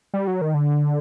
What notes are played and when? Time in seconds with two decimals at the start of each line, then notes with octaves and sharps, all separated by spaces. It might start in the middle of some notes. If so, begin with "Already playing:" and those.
0.14 G3
0.27 F#3
0.41 D#3
0.54 D3